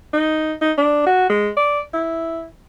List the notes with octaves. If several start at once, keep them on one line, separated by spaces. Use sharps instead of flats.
D#4
D#4
D4
F#4
G#3
D5
E4